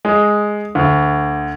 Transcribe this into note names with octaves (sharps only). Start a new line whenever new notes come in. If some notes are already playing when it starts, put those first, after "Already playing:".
G#3
D2